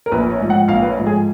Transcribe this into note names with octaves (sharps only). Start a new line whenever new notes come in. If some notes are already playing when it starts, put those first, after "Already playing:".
A#4
A#1 B4
C#5
G#2 F3
F#5
A#1 F5
B4
C#5
G#2 F3
G#4